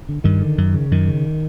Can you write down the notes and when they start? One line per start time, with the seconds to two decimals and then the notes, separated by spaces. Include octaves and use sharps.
0.09 D3
0.24 G2 D#3
0.41 D3
0.58 F#2
0.74 C#3
0.91 F#2 D#3
1.07 C#3